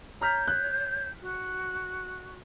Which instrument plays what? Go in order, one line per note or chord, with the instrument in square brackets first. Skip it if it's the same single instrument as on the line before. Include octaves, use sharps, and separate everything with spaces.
[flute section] C#5 G6 [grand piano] A#5 F6 B6
[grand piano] F#6
[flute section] F#4